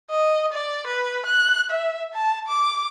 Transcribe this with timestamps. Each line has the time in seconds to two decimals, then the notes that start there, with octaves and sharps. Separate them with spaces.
0.10 D#5
0.53 D5
0.87 B4
1.26 F#6
1.70 E5
2.14 A5
2.48 D6